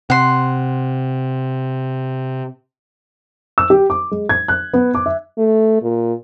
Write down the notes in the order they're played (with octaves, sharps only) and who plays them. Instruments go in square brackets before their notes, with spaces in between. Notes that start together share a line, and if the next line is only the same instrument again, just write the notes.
[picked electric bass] C3 [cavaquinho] F#5 C6
[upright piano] E6
G4
D6
G#3
G#6
F#6
B3
D6
E5
[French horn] A3
A#2